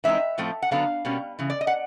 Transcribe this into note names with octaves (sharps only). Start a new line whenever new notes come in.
E3 G#3 C4 D#4 E5
A2 F3 A3 C4
F#5
D3 F#3 B3 D4 F5
B2 G3 A#3 C#4
C#3 E3
D5
D#5
F#5